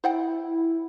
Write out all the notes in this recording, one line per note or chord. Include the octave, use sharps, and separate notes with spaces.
E4 C5 F#5 G5